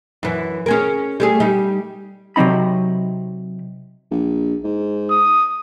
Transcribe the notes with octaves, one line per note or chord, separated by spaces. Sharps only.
F#2 E3
C#4 G#4 A#4
G3 A3 G#4
G3 D#4
C3 F#3 C4 D#4 B5
A#1
G#2
D#6